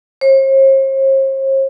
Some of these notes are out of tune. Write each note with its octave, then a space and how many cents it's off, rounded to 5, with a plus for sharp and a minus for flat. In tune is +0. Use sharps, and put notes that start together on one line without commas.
C5 +45